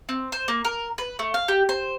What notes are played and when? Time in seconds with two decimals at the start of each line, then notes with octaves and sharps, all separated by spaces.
0.09 C4
0.32 C5
0.48 A#3
0.65 A#4
0.98 B4
1.19 A3
1.34 F5
1.48 G4
1.69 C5